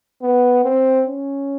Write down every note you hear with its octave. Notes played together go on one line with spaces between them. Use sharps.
B3
C4
C#4